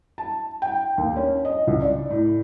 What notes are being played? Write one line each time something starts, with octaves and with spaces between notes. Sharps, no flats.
A5
G5
D#2
C#4
D#5
C#2
D5
A2